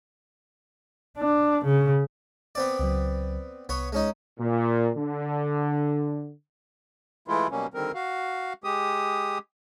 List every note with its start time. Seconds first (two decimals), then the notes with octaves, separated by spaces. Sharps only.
1.18 D4
1.65 C#3
2.55 B3 C4 D5
2.79 C#2 F#3
3.69 C2 B3 C#5
3.92 G#3 C#4 D#4
4.39 A#2
4.95 D3
7.28 E3 G#3 A3 E4 F4
7.51 B2 F#3 G3 A#3 C#4
7.74 D3 D#3 G3 C4 A#4
7.94 F#4 F5
8.64 G#3 G4 D#6